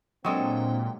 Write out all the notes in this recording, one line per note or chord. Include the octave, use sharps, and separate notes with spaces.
A#2 F#3 G#3 C4 D4 A4 G5